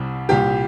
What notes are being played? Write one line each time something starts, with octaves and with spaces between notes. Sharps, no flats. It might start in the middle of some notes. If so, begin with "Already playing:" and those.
Already playing: C2 C3 G3
C2 A#2 G3 G4